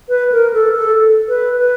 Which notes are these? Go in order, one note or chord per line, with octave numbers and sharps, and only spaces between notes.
B4
A#4
A4
A4
B4
B4